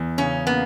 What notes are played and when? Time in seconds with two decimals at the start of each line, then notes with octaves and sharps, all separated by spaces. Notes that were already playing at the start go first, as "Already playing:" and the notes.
Already playing: E2
0.18 C#3 C#4
0.47 A#3 B3